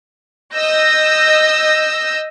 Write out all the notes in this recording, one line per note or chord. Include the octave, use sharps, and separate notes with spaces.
D#5 E6 G6 A#6